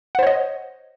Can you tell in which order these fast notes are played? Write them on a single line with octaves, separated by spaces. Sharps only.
F#5 C5 C#5 D#5